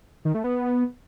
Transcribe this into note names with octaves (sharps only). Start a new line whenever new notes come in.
D#3
A3
B3